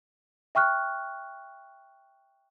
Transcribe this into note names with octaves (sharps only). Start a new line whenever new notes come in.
E5 G5 C#6 F6 F#6